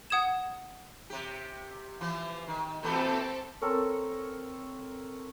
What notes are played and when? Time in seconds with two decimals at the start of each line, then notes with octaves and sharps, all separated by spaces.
0.10 F#5 D#6 G#6 E7
1.10 C3 G4
2.01 E3 F3
2.48 D#3
2.83 A#2 E3 A3 C4 G4 A4
3.62 C4 A4 A#4 C#5